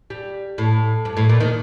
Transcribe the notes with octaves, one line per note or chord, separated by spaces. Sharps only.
G3
A2
G2
A2
A#2
D#3